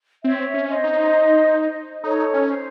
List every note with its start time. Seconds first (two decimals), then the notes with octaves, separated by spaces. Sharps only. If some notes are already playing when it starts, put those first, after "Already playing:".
0.23 C4 C#5 E5
0.54 C#4
0.69 C5 D#5
0.84 D#4
2.03 D#4 A4 C#5
2.33 C#4
2.49 C5